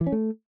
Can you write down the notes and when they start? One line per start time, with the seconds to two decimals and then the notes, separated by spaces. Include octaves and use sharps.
0.01 E3
0.07 C#4
0.12 A3